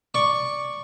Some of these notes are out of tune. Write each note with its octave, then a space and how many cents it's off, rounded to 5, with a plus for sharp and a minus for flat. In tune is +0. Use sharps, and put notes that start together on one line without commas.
D5 +0 C#6 +0